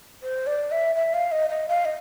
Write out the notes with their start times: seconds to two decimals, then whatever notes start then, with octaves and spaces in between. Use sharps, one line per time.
0.22 C5
0.47 D5
0.71 E5
0.95 E5
1.14 F5
1.32 D#5
1.50 D#5
1.69 F5
1.85 D#5